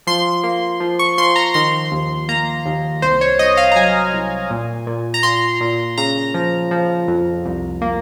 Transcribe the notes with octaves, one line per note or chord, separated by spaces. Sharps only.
F3 C6
A#3
F3
C#6
F3 C6
A#5
D#3 C6
D#2
A#3 A#5
D#2
C2 C5
C#5
C2 D#5
F5
A#5
F#3 G#5
C2
A#2
A#2
A#5
A#2 C6
A#2
C#3 A#5
F3
F3
F2
C2
A#3